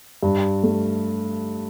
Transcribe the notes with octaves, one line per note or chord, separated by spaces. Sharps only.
G2
A3